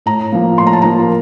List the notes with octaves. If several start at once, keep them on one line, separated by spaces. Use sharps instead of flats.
A2 A#5
F3 A#3
A2 C6
A#5
A5
F3 A#3 A#5
A#4